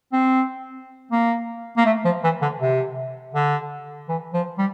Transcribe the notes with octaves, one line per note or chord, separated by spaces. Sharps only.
C4
A#3
A#3
A3
F3
E3
D3
C3
D3
E3
F3
G3